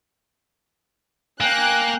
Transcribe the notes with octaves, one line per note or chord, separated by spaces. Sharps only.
A#3 G5 G#5 F#6